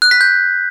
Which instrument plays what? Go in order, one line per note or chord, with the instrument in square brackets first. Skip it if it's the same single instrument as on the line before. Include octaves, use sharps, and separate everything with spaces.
[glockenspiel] F#6
B6
G6